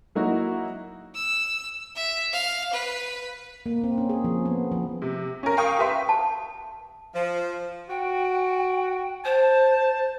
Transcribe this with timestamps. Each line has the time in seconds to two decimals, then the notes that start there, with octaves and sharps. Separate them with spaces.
0.15 F#3 A#3 D#4 E4 F#4
1.14 E6
1.96 E5
2.33 F5
2.73 B4
3.66 A#3
3.84 C4
3.98 C#4
4.09 G#4
4.24 F3
4.45 B3
4.72 F3
5.02 C3
5.43 C#4 A#4
5.57 F5 G5 C#6 D#6
5.78 G4 B4 E5 C6
6.09 A5
7.14 F3
7.90 F#4 G5
9.25 C5 A5